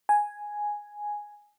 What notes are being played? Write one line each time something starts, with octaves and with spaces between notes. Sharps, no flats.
G#5